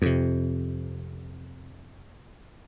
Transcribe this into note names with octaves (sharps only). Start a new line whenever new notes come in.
F2 C3